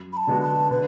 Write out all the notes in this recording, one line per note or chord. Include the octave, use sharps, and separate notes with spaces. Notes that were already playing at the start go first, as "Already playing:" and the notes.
Already playing: F#2
B5
A5
D3 G#3 B3 F#4
A5
D3 B4